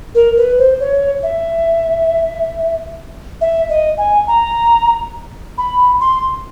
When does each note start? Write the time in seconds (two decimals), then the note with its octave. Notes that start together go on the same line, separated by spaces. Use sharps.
0.15 A#4
0.37 B4
0.58 C5
0.80 C#5
1.23 E5
3.41 E5
3.70 D#5
3.98 G#5
4.27 A#5
5.58 B5
6.01 C6